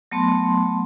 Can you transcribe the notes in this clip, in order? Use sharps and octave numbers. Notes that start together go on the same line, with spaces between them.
F#3 A3 B3 A5 C6